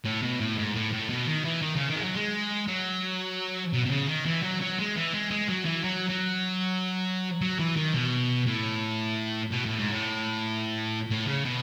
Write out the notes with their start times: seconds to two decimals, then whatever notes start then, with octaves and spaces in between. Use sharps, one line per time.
0.05 A2
0.22 B2
0.40 A2
0.57 G#2
0.75 A2
0.92 A2
1.09 B2
1.27 D#3
1.45 E3
1.62 D#3
1.76 C#3
1.89 D#3
1.96 G#3
2.02 F#3
2.15 G#3
2.68 F#3
3.73 B2
3.85 B2
3.91 C#3
4.07 D#3
4.25 E3
4.43 F#3
4.61 F#3
4.79 G#3
4.96 E3
5.13 G#3
5.31 G#3
5.49 F#3
5.65 E3
5.84 F#3
6.10 F#3
7.41 F#3
7.59 E3
7.76 D#3
7.94 B2
8.47 A2
9.52 B2
9.66 A2
9.79 G#2
9.91 A2
11.10 A2
11.27 C#3
11.45 B2